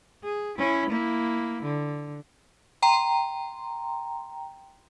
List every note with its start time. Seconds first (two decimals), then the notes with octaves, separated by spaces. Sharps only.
0.24 G#4
0.58 C#4 E4
0.90 A#3 E4
1.63 D3
2.82 G5 A#5 C6